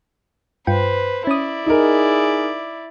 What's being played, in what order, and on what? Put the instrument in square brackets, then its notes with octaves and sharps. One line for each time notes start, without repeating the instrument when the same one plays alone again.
[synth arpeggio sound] G2 F4 G5 [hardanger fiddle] B4 C5
[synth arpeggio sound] C#4 D#6 [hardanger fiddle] E4 D5
[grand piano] D#4 A#4 [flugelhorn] G#4